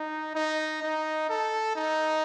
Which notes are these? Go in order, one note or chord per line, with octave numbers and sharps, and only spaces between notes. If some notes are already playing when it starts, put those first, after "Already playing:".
Already playing: D#4
D#4
D#4
A4
D#4